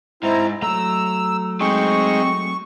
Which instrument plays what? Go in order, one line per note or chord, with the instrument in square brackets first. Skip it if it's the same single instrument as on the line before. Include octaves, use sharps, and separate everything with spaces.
[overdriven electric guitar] G#2 [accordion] C4 E4 A#5
[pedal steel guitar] F#3 A3 [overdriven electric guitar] A#5 [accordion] E6
[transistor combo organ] G#3 D#4 [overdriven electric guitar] C4 [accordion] C#6